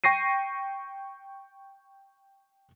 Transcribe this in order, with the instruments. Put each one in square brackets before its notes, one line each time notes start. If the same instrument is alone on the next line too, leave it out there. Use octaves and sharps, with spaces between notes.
[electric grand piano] G5 C#6 A#6 C7 D#7